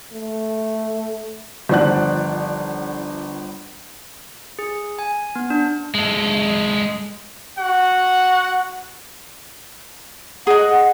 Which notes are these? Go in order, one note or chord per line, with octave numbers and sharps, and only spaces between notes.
A3
G1 D#3 F3 D5 F#5 F#6
G#4
G#5
B3
D4
G#3 A4
F#4 F#5
G#4 D#5 F#5